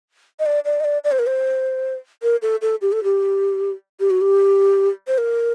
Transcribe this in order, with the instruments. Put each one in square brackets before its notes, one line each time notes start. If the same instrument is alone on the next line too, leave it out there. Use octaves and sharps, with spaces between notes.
[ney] D#5
D5
D5
D#5
D5
D5
C5
A#4
C5
A#4
A4
A4
G4
A4
G4
G4
F#4
G4
C5
A#4